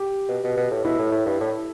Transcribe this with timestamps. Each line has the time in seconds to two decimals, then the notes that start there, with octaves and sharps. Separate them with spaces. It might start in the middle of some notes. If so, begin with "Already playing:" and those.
Already playing: G4
0.29 B2
0.44 B2
0.57 B2
0.71 A2
0.85 B2 E4
0.99 A2
1.12 A2
1.26 G2
1.41 A2